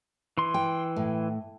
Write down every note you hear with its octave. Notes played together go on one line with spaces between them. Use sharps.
E3 C6
G5
A2